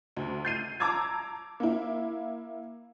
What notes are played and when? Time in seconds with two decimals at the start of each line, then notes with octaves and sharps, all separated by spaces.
0.17 D2
0.45 G6 C7 D#7
0.80 A5 A#5 D6 E6 G#6
1.60 A#3 E4